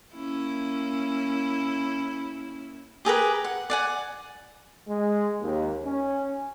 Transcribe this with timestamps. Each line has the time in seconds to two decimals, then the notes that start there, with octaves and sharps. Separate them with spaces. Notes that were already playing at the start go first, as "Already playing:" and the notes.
0.14 A#3 C#4 E4
3.05 G4 G#4 A#4 B4
3.44 F#5
3.70 D5 F#5 G#5
4.88 G#3
5.40 D#2
5.85 C#4